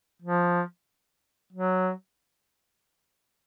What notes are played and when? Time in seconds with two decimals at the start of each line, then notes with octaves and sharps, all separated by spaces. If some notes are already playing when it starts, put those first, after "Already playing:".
0.22 F3
1.53 F#3